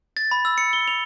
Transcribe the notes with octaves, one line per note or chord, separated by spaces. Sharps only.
A6
B5
E6
C#7
G7
F7